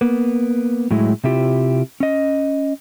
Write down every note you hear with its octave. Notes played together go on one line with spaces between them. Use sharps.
A#3 B3
A2 F#3 G#3 E4
C3 C4 E4 F4 G4
C#4 D#5